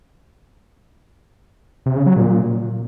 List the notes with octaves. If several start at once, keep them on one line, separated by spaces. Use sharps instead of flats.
C3
C#3
F#3
A#2